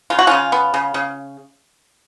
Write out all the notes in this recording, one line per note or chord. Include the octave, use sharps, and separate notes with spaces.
C#3 F4
F#4
C#3 C#4 F4
B3
C#3
C#3